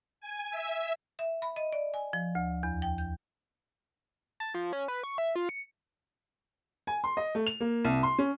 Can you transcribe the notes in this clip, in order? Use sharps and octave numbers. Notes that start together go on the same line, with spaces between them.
G#5
E5
E5
B5
D#5
D5
G#5
F3
D2
E2
G5
G6
A5
F3
C#4
B4
C#6
E5
F4
C#7
G#5
C6
D#5
A3
F7
A#3
C2
C6
C#4